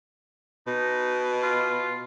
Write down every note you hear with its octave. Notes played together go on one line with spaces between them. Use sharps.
B2 D#4
F4